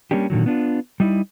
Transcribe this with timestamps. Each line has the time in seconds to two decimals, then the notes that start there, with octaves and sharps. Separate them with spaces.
0.11 G3 G#3 A#3 C#4 D4 G4
0.30 A#2 D3 D#3 F#3
0.46 B3 D4 F4
1.00 G3 D#4 E4